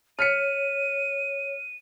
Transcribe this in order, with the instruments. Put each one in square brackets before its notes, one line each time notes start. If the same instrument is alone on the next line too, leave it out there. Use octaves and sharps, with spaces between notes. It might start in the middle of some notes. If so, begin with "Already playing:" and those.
[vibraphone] C#5 [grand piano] F6 B6 C#7 [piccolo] D#7